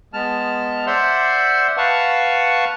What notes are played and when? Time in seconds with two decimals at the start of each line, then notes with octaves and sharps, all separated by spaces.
0.14 G#3 B3 A5 F6
0.87 C5 D5 E5 F#5 C6
1.77 B4 F5 F#5 A5 C#6